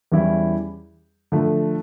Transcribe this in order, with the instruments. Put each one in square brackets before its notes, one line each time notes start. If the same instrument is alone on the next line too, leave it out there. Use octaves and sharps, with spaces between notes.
[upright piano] E2 E3 G3 C#4 E4
D3 F3 A3